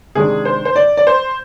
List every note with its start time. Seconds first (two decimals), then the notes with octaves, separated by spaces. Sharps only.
0.15 C3 D#3 G#3 D4 G#4
0.45 C5
0.65 C5
0.76 D5
0.97 D5
1.07 C5